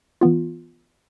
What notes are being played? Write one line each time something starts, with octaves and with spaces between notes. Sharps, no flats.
E3 B3 F4